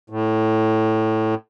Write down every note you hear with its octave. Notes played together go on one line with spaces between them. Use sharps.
A2